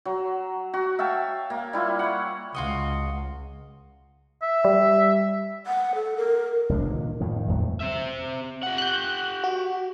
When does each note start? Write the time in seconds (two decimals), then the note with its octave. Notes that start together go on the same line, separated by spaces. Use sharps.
0.05 F#3
0.74 F#4
0.99 E5 F5 G5 A5
1.50 A#3
1.73 G3 E4 F4
1.99 C#5 F#5
2.55 C#2 F4 F#4 D#5
4.42 E5
4.65 G3
5.67 F#5
5.95 A4
6.17 A#4
6.69 F1 C2 G#3 D4
6.87 A#2 D#3
7.20 F2 A2 D#3
7.47 G1 E2 A2 F#3
7.80 C4 E5
8.63 G4 F#5
8.78 F#6 G6
9.44 F#4